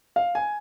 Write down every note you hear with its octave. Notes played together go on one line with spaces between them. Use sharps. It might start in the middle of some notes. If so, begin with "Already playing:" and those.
F5
G#5